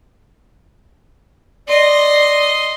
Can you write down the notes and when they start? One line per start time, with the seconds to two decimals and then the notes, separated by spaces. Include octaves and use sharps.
1.68 D5 D#5 C6